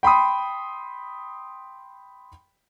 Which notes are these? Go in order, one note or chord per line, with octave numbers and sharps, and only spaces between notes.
G5 B5 C6 D#6